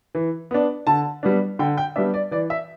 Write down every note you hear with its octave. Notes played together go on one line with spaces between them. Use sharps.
E3
B3 D4
D3 A5
G3 B3 D4
D3 G5
G5
G3 B3 D4 E5
D5
E3 D5
E5